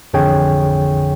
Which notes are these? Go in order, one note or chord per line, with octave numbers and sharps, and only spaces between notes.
A1 F2 D3 G#4 C#5 G5